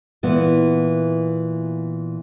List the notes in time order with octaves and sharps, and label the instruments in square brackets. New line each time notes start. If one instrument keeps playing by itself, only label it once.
[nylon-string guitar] A#2 E3 B3